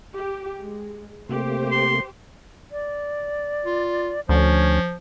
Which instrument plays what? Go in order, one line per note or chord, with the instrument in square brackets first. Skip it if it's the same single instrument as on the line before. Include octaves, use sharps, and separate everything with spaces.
[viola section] G4
G#3
[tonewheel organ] C3 A3 A#3 [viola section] G4 C5
[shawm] C6
[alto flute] D5
[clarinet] F4
[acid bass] D2 [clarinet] F3 [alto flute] C#4